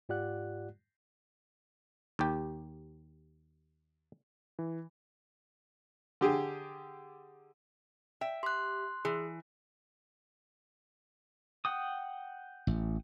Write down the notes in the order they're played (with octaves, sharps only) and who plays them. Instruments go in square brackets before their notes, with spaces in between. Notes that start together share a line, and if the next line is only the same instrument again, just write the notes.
[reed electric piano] G#2 F4 G4 D5 F#5 F#6
[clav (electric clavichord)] D#2 G4
[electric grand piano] E3
[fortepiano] D3 G4 G#4
[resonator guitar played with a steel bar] E5 [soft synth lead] G5
[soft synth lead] G4 [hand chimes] C6 F#6
[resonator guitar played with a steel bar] E3 [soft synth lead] G#4
[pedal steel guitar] F#5 G5 D#6
[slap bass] A1